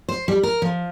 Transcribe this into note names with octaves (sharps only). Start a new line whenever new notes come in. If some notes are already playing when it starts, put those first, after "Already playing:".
C5
G3
A#4
F3